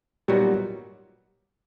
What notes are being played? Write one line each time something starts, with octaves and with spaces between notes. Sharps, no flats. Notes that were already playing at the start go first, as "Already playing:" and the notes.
A#2 F#3 G3 B3 D#4 F#4